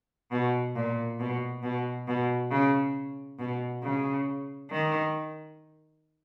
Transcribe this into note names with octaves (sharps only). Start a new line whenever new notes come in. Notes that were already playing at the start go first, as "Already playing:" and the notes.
B2
A#2
B2
B2
B2
C#3
B2
C#3
D#3